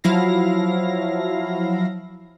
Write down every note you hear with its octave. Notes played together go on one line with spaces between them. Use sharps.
F3 F#3 E4 F5 A#6